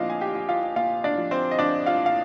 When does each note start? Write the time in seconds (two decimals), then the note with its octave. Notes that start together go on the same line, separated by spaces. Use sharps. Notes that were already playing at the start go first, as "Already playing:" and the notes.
Already playing: A#1 A#2 F3 C4 D4 F4 D#5 F5
0.10 G#5
0.21 G4 G5
0.34 A#1
0.49 F4 F5
0.76 A#2 F4 F5
1.04 D4 D5
1.18 F3
1.31 C4 C5
1.51 D#5
1.59 A#1 D4 D5
1.86 F4 F5
2.06 F5